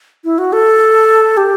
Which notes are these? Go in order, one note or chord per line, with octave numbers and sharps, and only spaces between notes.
E4
F#4
A4
G4